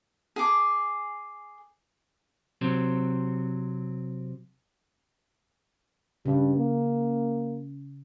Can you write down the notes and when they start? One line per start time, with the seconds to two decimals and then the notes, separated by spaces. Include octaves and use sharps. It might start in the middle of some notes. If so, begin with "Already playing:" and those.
0.36 G#4 D6
2.61 C3 F#3 C4
6.26 G2 C#3
6.57 A#3